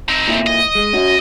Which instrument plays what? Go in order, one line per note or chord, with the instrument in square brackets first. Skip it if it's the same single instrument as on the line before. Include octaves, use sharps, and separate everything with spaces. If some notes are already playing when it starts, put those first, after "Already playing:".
[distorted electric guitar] C4 D#4
[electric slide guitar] A#2 E4
[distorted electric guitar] D#5
[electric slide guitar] G#3
C#4 F#4